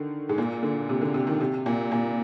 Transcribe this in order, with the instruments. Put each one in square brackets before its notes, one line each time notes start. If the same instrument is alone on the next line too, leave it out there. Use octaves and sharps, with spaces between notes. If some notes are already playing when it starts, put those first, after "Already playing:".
Already playing: [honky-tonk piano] D3 D#3
G#2
A#2
D3
C3
D3
C3
D#3
C3
A#2
A#2